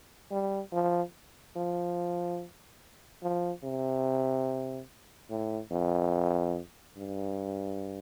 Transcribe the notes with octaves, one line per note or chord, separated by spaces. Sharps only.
G3
F3
F3
F3
C3
A2
F2
G2